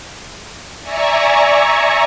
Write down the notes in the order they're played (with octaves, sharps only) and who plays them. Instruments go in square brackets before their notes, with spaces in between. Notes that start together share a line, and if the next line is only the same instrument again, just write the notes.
[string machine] D5 E5 G#5 A#5 C#6